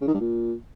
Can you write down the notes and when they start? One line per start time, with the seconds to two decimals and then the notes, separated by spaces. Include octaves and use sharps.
0.01 C#3
0.08 D#3
0.14 G2
0.20 A#2